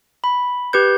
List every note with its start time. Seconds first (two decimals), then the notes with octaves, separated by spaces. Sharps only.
0.24 B5
0.73 G4 B4 G6